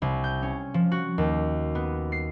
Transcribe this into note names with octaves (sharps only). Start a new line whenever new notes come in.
C2
G6
C#4
F3
F#4
D#2
B3
C7